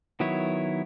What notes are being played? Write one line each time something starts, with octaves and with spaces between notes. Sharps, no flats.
D#3 F#3 B3 E4 C#5